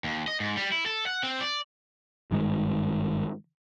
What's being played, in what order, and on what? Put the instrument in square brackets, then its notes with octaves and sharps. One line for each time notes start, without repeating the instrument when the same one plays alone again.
[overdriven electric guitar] D#2
D#5
G#2
G3
E4
A4
F#5
C4
D5
[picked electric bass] G#1 G2 D#3 G#3